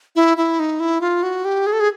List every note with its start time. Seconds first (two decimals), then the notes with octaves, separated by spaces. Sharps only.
0.16 E4
0.37 E4
0.59 D#4
0.80 E4
1.01 F4
1.23 F#4
1.45 G4
1.66 G#4
1.73 A4
1.80 G#4